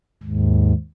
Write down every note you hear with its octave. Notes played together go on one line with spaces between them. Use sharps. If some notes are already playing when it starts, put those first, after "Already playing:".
D#2 G#2